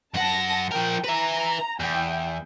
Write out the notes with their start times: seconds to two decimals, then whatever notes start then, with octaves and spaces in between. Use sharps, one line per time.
0.14 F#2 F#5 A5 A#6
0.71 F3 A#4 G5
1.04 B4 E5 A#5
1.80 E2 G5